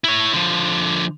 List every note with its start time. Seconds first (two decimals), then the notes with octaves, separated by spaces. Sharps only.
0.04 E4 C#5
0.34 D3 F3